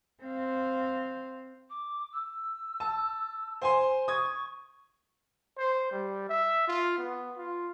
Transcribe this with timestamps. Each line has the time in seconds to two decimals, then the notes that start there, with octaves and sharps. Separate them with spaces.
0.23 C4 F5
1.70 D6
2.12 E6
2.80 A5
3.62 C5 G#5 C6
4.08 C#6 D#6 G#6
5.58 C5
5.91 G3
6.29 E5
6.68 F4
6.98 B3
7.37 F4